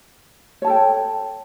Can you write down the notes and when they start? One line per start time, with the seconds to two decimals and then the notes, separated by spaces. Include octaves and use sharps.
0.62 C#5
0.65 A5
0.67 A4
0.70 G5